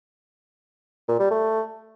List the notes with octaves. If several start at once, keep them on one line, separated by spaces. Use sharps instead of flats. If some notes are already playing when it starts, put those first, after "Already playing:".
A#2
G3
A3